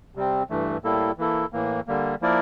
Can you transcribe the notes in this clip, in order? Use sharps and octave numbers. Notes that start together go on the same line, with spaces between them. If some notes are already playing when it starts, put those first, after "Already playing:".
C3 G3 C4
G2 E3 A3
A2 G3 A#3 E4 A4
E3 A#3 E4 A4
A2 E3 A#3
D3 G3 A#3
F3 A#3 E4 A#4 D5